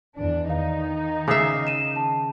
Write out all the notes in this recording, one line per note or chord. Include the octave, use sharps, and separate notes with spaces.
E2 E3 D4
D#3 D#4 F5
C#3 E5 D6 D#6 C7
D#7 E7
A5